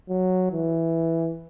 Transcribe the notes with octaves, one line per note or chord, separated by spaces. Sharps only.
F#3
E3